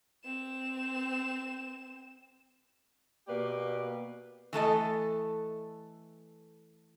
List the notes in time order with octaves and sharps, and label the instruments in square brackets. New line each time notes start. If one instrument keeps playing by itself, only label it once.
[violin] C4 E7
[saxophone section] B2 A#3 G4 B4 D5
[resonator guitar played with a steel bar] E3 A3 A4 D#5